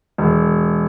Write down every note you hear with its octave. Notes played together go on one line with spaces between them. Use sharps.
E1